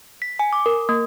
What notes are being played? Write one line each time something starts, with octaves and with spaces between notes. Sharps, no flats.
B6
G#5
D6
A#4
A#3